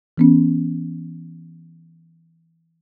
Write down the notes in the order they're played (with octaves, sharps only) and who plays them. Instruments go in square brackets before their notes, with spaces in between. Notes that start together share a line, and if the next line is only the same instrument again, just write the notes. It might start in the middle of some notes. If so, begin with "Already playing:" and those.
[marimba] E3 B3 C#4